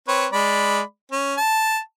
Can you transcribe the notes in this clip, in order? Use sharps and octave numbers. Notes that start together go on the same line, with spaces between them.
C4 B4 C#5
G#3 D5 B5
C#4
A5